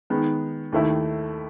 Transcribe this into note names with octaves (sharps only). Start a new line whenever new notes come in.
D#3 G#3 B3
D#2 D#3 A3 E4